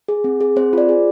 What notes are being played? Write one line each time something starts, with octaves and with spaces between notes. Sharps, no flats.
G#4
C4
G#4
C4 C5
F4 D5
G#4